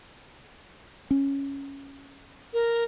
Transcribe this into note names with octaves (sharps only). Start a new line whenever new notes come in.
C#4
A#4